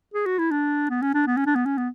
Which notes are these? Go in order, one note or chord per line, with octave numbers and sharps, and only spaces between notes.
G#4
F#4
E4
D4
B3
C#4
D4
B3
C#4
D4
B3
C#4
B3